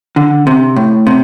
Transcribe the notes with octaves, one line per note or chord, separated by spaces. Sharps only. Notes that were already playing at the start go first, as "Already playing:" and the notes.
D3
C3
A2
C3